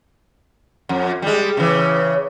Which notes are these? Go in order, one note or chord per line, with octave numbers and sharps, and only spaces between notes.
F2
G3 G#3
C#3 E3